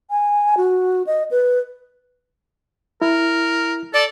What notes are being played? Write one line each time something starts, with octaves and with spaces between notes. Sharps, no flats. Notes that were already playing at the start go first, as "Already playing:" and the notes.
G#5
F#4
D#5
B4
E4 A#4
A4 D5